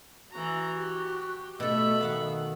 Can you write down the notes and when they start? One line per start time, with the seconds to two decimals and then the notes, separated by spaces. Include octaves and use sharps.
0.32 E3 F#4 A#5
0.78 G4
1.60 B2 A3 A4 E5 B5
2.01 D#3 B3 F5 F#5